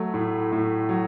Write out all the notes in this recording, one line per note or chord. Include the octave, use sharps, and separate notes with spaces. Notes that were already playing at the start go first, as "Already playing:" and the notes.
Already playing: F#3 A3
A2
A2
F#3